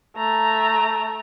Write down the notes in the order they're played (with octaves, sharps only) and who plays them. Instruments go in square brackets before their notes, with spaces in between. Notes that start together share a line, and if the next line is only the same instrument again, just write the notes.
[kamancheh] A3 A#5